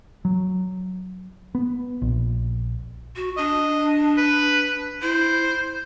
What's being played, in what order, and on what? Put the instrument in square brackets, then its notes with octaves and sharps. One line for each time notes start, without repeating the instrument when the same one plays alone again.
[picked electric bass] F#3
B3
A#1
[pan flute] F#4
[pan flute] D4 [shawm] D#5
[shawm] B4
[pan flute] E4 [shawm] C5